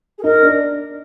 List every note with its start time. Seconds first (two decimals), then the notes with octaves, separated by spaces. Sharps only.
0.18 G#4
0.24 D#4 A#4
0.42 D4